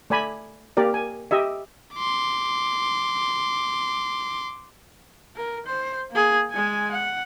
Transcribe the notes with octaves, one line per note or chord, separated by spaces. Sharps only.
A3 D5 G#5 B5
A#3 G4 A#4 D5
G#5
G4 D#5 E5
C6 D6
A#4
C5
A#3 G#4
G#3 G#5
F#5